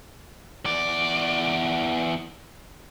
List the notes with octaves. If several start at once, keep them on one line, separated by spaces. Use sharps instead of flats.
E2 D5